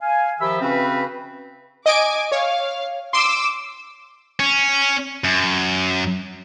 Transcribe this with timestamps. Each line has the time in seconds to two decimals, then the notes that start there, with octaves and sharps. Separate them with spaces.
0.01 F5 G#5
0.40 D#3 F3 G4 E5 B5 E6
0.61 C#3 C4 C#4 F#4 B4
1.86 D#5 G#5 D6 D7
2.32 C#5 F5
3.13 C6 D6 E6
4.40 C#4
5.24 F#2